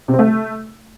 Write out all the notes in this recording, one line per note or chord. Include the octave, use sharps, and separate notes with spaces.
C3
C4
A3